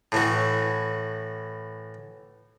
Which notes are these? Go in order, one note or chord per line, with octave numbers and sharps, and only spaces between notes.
A2 E3 F#4